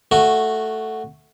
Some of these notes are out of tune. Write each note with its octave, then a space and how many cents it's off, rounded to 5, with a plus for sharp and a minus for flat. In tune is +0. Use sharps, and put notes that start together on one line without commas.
A3 +0 F#4 +0